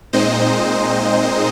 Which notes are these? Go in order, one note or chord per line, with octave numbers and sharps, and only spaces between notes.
A#2 G#3 C4 D#4 C5 D#5